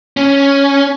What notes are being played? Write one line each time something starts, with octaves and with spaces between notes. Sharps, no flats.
C#4